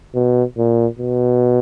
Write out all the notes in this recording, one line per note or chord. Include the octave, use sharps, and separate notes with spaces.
B2
A#2
B2